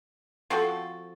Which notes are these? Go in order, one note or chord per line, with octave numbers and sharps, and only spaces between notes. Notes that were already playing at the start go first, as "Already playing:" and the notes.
F3 C4 F#4 A4